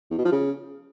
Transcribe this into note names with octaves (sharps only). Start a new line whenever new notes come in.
E2
B2
F3
C#3